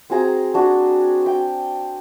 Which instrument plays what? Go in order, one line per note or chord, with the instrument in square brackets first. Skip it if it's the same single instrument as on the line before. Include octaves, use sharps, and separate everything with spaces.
[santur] C4 F#4 G#4 A#5
D4 F#4
G5